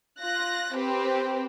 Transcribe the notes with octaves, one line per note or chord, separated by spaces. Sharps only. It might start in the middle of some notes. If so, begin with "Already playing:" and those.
F4 F#6 A#6
C4 G4 B4